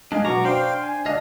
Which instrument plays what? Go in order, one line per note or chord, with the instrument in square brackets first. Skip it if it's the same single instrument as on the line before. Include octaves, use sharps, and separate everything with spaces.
[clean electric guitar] G#3 D4 [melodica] D#5 F5 G#5
[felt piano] B2 F#3 [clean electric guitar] A#5 [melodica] C#6 D6
[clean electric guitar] D4 [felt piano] C5 [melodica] F5 G5 C6
[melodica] G#5
[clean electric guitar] D2 D#5 F5 [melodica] D4